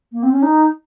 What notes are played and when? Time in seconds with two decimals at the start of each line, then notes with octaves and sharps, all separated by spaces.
0.12 A#3
0.23 C4
0.32 C#4
0.43 D#4